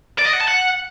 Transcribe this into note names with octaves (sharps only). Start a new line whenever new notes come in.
D5
D#5
F#5
A5
F#5